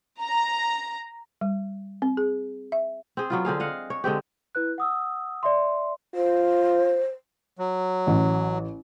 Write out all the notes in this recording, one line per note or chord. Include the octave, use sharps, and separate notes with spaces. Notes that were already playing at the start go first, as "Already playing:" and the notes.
A#5
G3
C4
G#4
E5
C4 G#4
F#3 B3 F4
D3 C4 G#4 F5
D#5 F5 F#5
C#5
D3 G#3 C4 G4
E4 B4 F#6
F#5 D#6 E6
D5 E5 C6
F4 C5
F#3
A1